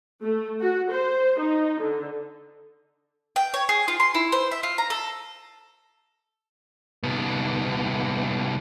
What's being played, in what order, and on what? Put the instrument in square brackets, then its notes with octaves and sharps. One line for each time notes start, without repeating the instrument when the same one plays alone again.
[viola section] A3
F#4
C5
D#4
D3
[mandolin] G5
C#5
G#4
F4
C6
E4
C5
E5
F4
A#5
A4
[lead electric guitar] C2 B3